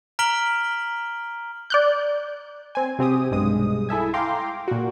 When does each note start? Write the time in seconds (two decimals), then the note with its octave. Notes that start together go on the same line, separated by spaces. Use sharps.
0.19 A#5 F6 B6 D7 F#7 G7
1.70 D5 F#6 G6
2.75 C4 G#5
2.99 C3 C4 G4 D#6
3.31 B1 G2 G#3 D#6
3.89 E4 A4 E5 G#5
4.14 F5 G5 A#5 C6 D6
4.68 A#2 F#4